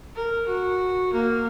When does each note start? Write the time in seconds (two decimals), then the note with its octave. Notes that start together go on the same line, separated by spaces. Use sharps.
0.16 A#4
0.46 F#4
1.13 A#3